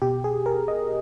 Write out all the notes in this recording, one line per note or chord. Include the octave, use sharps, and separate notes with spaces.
B2 G4
G#4
A#4
D#5